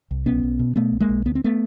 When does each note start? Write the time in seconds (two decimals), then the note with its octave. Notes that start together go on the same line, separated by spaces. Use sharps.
0.11 C2
0.26 B1 B3 C#4
0.43 B1
0.59 B2
0.76 B2 A3 B3
0.93 B1
1.00 G#3 A#3
1.09 B1
1.26 D2 B3
1.35 C4
1.44 A3 B3